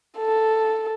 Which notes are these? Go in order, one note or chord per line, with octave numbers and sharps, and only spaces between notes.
A4